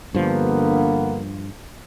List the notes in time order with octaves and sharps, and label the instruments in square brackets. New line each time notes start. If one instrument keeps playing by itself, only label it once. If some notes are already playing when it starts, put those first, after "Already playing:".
[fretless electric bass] G2 F3 [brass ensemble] D3 A#3 B3